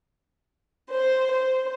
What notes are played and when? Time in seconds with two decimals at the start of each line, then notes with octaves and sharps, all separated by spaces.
0.90 C5
1.30 C5